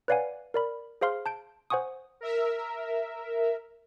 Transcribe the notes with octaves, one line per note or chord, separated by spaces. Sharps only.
B4 C#5 D5 F5 F#5 G#5
A#4 D5 B5
G#4 C5 F5 C6 F6
A5 G6 D7
C5 F#5 G#5 C#6 D#6
A#4 E5